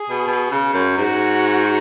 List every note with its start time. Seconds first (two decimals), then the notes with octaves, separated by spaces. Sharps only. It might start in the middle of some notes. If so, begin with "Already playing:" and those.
Already playing: G#4
0.09 B2
0.27 B2
0.51 C#3
0.73 F#2
0.97 G#2 F#4